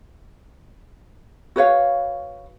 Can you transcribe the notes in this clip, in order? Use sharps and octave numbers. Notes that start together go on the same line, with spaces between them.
F#4 B4 C#5 F5